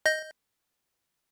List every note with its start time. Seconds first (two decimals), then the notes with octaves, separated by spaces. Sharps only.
0.06 D#5 G6 A#6